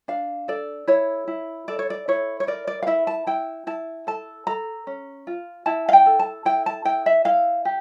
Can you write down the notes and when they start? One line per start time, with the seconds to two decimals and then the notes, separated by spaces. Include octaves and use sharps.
0.08 D4 F5
0.48 A4 D5
0.87 E4 C#5
1.27 E4
1.68 A4 D5
1.79 C#5
1.90 D5
2.08 E4 C#5
2.40 C#5
2.47 A#4 D5
2.67 D5
2.82 F5
2.87 E4 E5
3.07 A5
3.27 E4 G5
3.67 E4 A5
4.07 A4 A5
4.47 A4 A#5
4.87 C#4
5.27 F4
5.66 E4 A5
5.88 F5
5.93 G5
6.06 A4
6.19 A5
6.45 E4 G5
6.66 A5
6.85 E4 G5
7.06 E5
7.25 E4 F5
7.65 G4